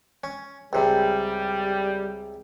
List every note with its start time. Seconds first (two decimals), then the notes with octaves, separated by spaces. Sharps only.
0.24 C#4
0.73 C#2 C3 G3